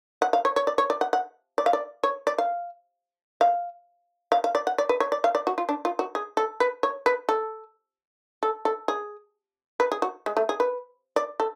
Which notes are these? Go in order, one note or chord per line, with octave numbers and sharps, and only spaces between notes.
F#5
F5
C#5
C#5
D5
C#5
D5
F#5
F#5
D5
F5
D5
C#5
D5
F5
F5
F5
F5
D5
F#5
D5
B4
C#5
D5
F5
D5
F#4
F4
D4
F4
F#4
G#4
A4
B4
C#5
B4
A4
A4
A4
G#4
B4
G#4
F#4
G#3
A3
G#4
B4
D5
A4